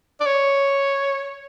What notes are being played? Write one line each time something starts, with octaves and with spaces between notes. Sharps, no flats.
D5
C#5